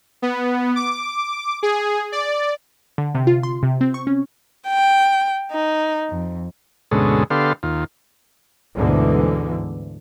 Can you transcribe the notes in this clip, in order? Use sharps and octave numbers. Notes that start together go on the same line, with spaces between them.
B3
D6
G#4
D5
D3
C3
F4
C6
C3
C4
C#6
C#4
G5
D#4
F2
D2 G#2 B2 G#3 C#4 A4
D3 B3 G4 A4 F5 C6
D#2 F4
D2 G#2 B2 D3 E3